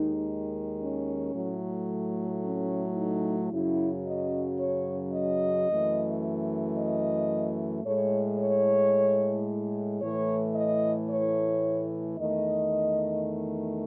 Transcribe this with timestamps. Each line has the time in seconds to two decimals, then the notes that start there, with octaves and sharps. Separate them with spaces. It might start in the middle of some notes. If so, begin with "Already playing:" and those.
Already playing: D#2 D#3 G#3 D#4
0.81 C#4
1.34 A2 F#3 A3
2.43 C#4
2.97 D#4
3.52 F#2 C#3 F#3 E4
4.06 D#5
4.60 C#5
5.13 D#5
5.68 F#2 E3 A3
6.76 D#5
7.84 A2 G#3 C#5
8.39 C#5
10.02 A2 E3 A3 C#5
10.55 D#5
11.09 C#5
12.18 E2 D#3 A3 D#5